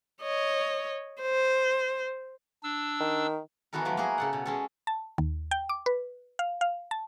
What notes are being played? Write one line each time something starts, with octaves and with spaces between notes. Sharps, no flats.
C#5 D#5
C5
D4 E6
D#3
D#3 E3 B3 F#4 A4 A#4
F3 F#3 A3
A#3 E4 F#4 G#4 A#4
C#3 A4 F#5
B2
G#3 C#4 A4
A5
D#2
G5
D6
B4
F5
F5
A5